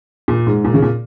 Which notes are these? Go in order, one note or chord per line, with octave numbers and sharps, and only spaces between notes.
A#2
G#2
A#2
C#3
A#2